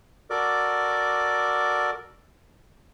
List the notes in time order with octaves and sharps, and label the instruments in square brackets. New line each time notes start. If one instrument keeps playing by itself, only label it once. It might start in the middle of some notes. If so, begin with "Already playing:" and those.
[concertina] F#4 A4 A#4 D5 D6